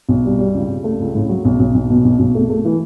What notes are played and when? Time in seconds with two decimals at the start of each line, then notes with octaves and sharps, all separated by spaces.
0.09 B1
0.25 G3
0.39 G3
0.54 C#2
0.69 C#2
0.84 A3
1.00 C#2
1.15 A2
1.29 F#3
1.45 B1
1.60 B1
1.74 B1
1.90 B2
2.05 B1
2.19 B1
2.35 A3
2.50 A3
2.65 E3